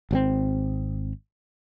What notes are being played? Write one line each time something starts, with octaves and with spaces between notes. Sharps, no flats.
G#1 C3 C4